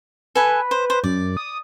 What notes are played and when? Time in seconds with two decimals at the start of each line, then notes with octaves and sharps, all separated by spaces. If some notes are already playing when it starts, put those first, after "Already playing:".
0.35 A4 B4 G#5
0.71 C5
0.90 C5
1.04 F#2 D5
1.37 D#6